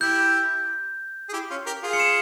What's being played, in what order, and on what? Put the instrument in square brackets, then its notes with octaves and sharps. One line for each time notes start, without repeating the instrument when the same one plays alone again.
[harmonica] E4 G4 [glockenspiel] G6
[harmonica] G#4
E4 G4
C#4 F4
G4 A#4
F4 G#4
[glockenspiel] C#7
E7